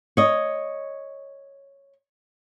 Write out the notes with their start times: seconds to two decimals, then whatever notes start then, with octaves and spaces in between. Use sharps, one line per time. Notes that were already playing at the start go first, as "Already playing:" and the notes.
0.17 C#5 D#5